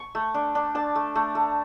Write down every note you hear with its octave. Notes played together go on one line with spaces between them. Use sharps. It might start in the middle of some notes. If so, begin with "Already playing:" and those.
Already playing: C#6
A3
D4
D4
D4 A5
A3
A3
A3